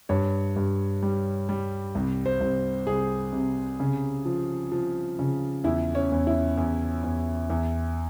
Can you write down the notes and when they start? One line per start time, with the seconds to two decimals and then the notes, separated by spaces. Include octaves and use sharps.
0.09 G2 C#5
0.56 G2
1.02 G3
1.49 G3
1.95 C2
2.26 C5
2.40 C2
2.87 C2 G#4
3.33 C3
3.80 C#3
4.25 F3
4.72 F3
5.19 C#3
5.64 E2 E4
5.95 C#4
6.11 E2
6.27 E4
6.57 E2
7.04 E2
7.50 E2